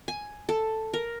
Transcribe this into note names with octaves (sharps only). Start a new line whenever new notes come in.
G#5
A4
A#4